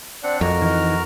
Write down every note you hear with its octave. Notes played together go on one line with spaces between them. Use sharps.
C4 D4 D5 F#5
F2 F#4 A#4 D#5 F6
E3 D#4